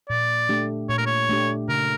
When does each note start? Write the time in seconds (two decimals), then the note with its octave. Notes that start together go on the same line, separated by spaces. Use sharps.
0.09 A#2 D5
0.49 A3 D4 G4
0.89 A#2 C#5
0.98 A#4
1.06 C#5
1.29 A3 D4 G4
1.68 C#3 A#4